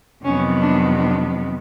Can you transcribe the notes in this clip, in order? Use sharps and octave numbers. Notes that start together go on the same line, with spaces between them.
F2 C3 D#3 F#3 B3 C#4
D4
D4